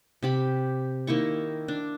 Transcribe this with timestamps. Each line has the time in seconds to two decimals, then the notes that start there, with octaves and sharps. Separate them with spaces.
0.23 C3 G4 B5
1.07 D#3 A#3 E4 C#6
1.68 D4